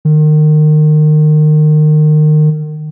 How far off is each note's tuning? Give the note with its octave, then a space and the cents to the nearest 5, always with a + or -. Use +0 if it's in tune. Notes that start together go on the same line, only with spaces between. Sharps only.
D#3 -30